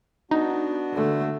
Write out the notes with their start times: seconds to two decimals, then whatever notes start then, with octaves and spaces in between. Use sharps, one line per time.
0.31 B3 D4 D#4 F#4
0.92 D3 A3